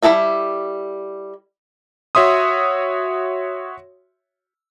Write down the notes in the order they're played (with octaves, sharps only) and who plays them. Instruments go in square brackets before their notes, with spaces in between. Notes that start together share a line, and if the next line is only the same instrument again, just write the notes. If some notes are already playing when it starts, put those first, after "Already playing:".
[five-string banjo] G3 E4 G#4 A4 E5
[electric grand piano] F#4 C#5 E5 C6 D#6